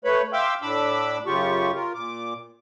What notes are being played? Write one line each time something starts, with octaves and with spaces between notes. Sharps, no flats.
A3 B4 C#5 B5
E5 F5 G5 C6 D6 E6
A2 D4 B5 D6 E6
F#2 C#3 F4 G4 C#6
F4 A#4
A#2 D6